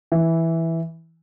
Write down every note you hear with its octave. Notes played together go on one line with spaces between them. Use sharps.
E3